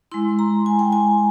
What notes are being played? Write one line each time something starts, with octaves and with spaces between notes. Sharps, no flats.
G#3 E4 C6
A#5
G#5
G5
G#5